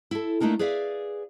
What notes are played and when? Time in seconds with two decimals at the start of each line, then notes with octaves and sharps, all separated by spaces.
0.11 E4 A4
0.40 A3 A#3 D4 D#4 A#4
0.59 G#4 B4 D5 E5 F5